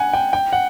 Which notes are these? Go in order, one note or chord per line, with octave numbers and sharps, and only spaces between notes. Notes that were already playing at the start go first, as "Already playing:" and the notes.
Already playing: F#5 G#5
G5
G5
F#5